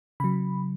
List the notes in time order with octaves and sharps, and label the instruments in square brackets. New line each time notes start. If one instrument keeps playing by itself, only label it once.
[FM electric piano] C#3 F#3 B5